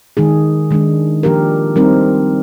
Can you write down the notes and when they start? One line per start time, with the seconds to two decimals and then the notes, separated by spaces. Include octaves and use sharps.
0.17 D#3 G#3 D#4 G#4
0.71 D#3 G#3 D4
1.23 F3 A#3 D4 G4 A#4
1.76 G3 C4 D#4 A#4